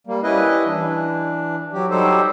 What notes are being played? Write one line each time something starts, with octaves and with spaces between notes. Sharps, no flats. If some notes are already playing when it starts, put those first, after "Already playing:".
G3 A#3
G3 C#4 E4 B4 D#5
E3 D4
F#3 G4
F#3 G3 D#4 G4 A4 C5